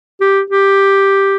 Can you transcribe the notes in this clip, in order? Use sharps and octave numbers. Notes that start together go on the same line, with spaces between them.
G4
G4